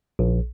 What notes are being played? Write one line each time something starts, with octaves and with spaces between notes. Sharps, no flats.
A#1